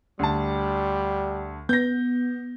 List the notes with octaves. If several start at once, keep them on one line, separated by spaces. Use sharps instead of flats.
D2 G3 A5
B3 G6 A#6